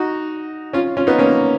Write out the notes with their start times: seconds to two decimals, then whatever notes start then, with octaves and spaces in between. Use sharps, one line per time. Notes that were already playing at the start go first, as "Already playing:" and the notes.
Already playing: D#4 F#4
0.73 C#4 F4
0.97 C#4 F4
1.07 B3 D#4
1.18 A#3 C#4